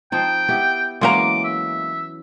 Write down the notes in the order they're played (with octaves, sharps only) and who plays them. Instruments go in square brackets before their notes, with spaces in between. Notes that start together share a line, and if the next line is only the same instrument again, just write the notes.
[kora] F3 C4 D#4 [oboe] G5
[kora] B3 E4 G4
[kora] E3 F#3 C#4 [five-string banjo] G#3 A#3 A#5 [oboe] D6
[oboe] E5